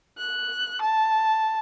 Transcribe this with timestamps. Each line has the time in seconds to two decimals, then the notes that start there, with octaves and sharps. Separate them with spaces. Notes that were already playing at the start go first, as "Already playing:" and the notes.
0.18 F#6
0.81 A5